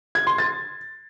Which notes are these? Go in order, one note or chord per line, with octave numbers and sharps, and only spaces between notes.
G#6
C6
A6